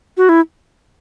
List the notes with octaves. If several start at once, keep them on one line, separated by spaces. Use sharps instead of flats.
F#4
E4